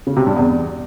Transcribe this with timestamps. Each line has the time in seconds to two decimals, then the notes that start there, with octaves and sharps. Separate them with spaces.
0.07 C#3
0.17 C3
0.26 G2
0.36 E2